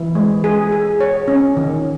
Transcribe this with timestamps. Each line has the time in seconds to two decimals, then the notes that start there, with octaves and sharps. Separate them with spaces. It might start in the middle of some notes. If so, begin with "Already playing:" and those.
Already playing: E3
0.15 G#3
0.44 G#4
0.72 G#4
1.01 C#5
1.28 C#4
1.57 D#3